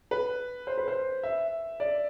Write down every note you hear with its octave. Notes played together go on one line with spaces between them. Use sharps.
B4
C5
B4
C5
E5
D5